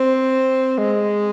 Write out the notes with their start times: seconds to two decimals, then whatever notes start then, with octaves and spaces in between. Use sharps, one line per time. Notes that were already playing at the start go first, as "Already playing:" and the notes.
Already playing: C4
0.78 G#3